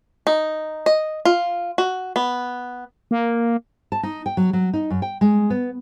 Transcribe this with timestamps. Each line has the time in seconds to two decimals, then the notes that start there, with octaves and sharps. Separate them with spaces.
0.27 D#4
0.86 D#5
1.25 F4
1.78 F#4
2.16 B3
3.11 A#3
3.92 A5
4.03 D#4
4.26 G5
4.37 F#3
4.53 F#3
4.73 D#4
4.90 F#2
5.02 G5
5.21 G#3
5.50 B3